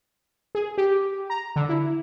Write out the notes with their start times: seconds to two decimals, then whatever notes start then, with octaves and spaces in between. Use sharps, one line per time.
0.55 G#4
0.78 G4
1.30 A#5
1.56 D3
1.69 E4